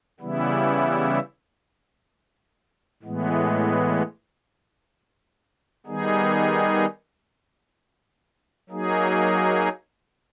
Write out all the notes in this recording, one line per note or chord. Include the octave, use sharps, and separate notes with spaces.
C#3 E3 G3 B3 E4
A2 E3 G#3 B3
D#3 G3 B3 D#4 G#4
F#3 A#3 D#4 G#4